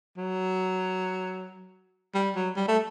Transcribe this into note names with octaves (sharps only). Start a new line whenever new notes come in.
F#3
G3
F#3
G3
A3